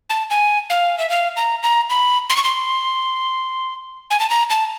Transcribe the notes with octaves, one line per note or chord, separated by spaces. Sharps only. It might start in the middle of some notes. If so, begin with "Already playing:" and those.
A5
G#5
F5
E5
F5
A#5
A#5
B5
C6
C#6
C6
G#5
A5
A#5
A5